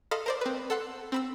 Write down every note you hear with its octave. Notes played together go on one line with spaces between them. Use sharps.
A4 D#5 F5 B5 C6 D#6
A#4 C5 D5
C4 B4
A4 F#5 C6
C4 B5 E6